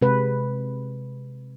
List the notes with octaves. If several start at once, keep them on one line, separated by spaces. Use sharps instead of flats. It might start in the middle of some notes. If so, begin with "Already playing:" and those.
C3 G#3 B4